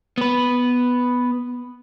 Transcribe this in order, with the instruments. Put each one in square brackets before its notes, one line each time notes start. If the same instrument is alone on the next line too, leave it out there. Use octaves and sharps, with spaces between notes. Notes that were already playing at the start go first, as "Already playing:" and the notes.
[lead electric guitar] B3 B4